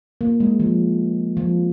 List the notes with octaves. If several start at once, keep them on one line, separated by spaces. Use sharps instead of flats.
A#3
G#3
F3
F3